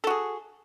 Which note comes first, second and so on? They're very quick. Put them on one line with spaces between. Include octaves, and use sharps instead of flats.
A4 F#4 G#4